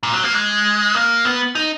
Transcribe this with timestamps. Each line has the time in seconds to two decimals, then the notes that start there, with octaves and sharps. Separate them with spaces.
0.03 A#2
0.13 F#3
0.24 A#3
0.34 G#3
0.95 A#3
1.25 B3
1.55 D#4